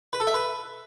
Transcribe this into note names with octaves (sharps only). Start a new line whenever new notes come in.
B4
A4
E5
B4